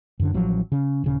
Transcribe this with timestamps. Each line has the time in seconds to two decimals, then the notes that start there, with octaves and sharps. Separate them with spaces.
0.20 F#2 D3
0.34 A1 F3 F#3
0.72 C#3
1.04 D#1 C#3